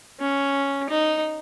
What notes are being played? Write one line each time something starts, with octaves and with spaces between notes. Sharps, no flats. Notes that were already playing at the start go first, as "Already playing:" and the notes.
C#4
D#4